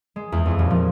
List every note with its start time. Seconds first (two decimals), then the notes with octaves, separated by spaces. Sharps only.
0.16 G#3
0.32 E2
0.46 F2
0.59 D#1
0.70 F3